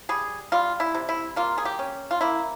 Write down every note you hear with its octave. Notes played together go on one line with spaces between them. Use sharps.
G3 G#4
G3 F4
E4
C3
E4
A#3 F4
G#4
G4
C#4
F4
A#3 E4